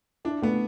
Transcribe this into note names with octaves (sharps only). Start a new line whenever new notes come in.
D4 E4
A3 B3